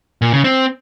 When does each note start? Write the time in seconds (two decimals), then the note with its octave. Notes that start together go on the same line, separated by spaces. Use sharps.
0.22 A#2
0.33 C#3
0.44 C4